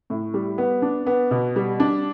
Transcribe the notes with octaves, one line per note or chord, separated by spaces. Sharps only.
A2
G3
B3
D4
B3
B2
G3
D4